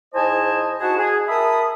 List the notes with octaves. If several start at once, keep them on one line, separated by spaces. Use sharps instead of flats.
G#2 E4 C5 D#5 G#5 A5
D#4 E4 F#4 G#4 F#5 A5
G#4
A#4 E5 A5 B5 D#6